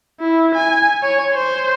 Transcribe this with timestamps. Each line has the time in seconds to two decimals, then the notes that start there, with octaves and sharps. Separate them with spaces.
0.20 E4
0.55 G#5
1.03 C#5
1.34 C5